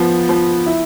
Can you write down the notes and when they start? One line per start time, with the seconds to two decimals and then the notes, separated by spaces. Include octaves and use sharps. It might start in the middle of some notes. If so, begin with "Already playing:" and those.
Already playing: F3 B3
0.29 F3
0.66 E4